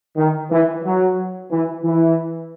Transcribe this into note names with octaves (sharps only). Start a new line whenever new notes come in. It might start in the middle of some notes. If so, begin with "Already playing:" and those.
D#3
E3
F#3
E3
E3